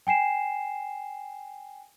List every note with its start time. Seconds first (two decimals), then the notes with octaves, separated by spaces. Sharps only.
0.07 G5 G#5 C7 E7